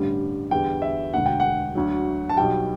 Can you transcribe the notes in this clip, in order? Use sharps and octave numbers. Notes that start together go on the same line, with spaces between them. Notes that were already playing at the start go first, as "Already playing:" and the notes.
Already playing: A1 G2 D3 G3
E2 D3 G3 G5
E5
E1 D2 D3 F#5
G5
F#5
D2 D3 F#3
A5
B1 B2 G3 G5